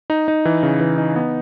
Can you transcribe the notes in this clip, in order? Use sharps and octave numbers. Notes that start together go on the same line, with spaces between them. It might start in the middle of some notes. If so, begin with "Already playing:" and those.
D#4
D#4
E3
C#3
E3
D#4
B3